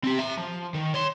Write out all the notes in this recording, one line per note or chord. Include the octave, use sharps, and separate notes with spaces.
C4 G4
E5 A#5
F3
D#3
C#5 C6